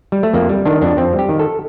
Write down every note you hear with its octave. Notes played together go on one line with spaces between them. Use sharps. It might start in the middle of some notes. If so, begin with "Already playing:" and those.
G3
A3
F2 A#3
G3
D#3 D4
F2 D4
F2 C4
G3
G4
D#3
A4